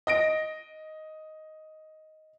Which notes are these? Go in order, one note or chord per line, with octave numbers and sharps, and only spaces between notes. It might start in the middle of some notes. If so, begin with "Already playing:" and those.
D#5 A#6 D7